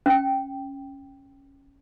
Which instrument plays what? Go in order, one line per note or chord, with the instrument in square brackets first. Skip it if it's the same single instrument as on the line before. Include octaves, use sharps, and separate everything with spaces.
[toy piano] C#4 G5